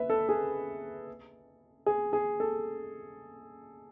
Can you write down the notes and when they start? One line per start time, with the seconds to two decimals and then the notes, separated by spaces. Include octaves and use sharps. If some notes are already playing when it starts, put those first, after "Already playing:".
Already playing: B4 E5
0.10 A4
0.29 G#4
1.86 G#4
2.13 G#4
2.40 A4